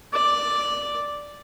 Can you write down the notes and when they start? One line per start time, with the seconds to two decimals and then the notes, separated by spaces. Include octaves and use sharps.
0.13 D5